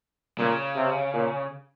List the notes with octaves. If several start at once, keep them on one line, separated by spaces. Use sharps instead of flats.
A#2 C#3
C3
A#2